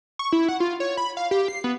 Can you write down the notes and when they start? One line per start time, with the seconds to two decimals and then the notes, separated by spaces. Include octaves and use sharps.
0.19 C#6
0.32 E4
0.49 F#5
0.60 F4
0.80 C#5
0.97 B5
1.17 F5
1.31 G4
1.48 C7
1.64 B3